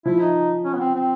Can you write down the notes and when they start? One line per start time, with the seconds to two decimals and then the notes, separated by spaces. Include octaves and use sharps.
0.06 F3 E4
0.21 D#4
0.65 C#4
0.74 B3
0.80 C4
0.95 C4